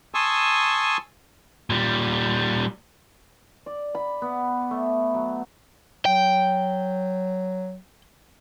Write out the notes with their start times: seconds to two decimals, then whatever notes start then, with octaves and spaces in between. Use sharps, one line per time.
0.14 G#5 A5 C6 C#6 D#6 E6
1.70 A#2 G3
3.66 D5
3.95 B5
4.22 B3
4.71 A3
5.14 F#3
6.05 F#3 G5